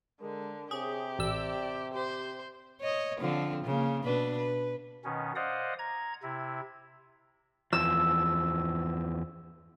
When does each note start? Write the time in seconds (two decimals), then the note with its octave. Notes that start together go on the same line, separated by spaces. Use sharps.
0.21 D3 G#3 A#4
0.71 C3 G4 G#4 C#5
1.19 A1 D5 E6
1.94 G4 C5
2.81 C#5 D#5
3.20 D3 F3 C4
3.65 C#3 A#3
4.04 B2 D4 B4
4.38 B4
5.04 B2 D#3 C#4
5.36 C5 D5 D#5 F5 F#5 D#6
5.79 A#5 G#6
6.23 C3 E4
7.73 E2 F3 E6